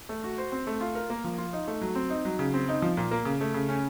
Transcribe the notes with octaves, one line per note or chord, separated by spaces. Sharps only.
A3
F#4
C5
C4
A3
F4
A#4
A#3
F3
F4
D#4
A3
F#3
C4
D#4
F#3
C#3
C4
D#4
F3
A#2
A#3
C#3
A3
C#3
C#4